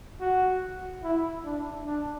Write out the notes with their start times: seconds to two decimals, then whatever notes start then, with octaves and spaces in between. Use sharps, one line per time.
0.20 F#4
1.03 E4
1.45 D4
1.86 D4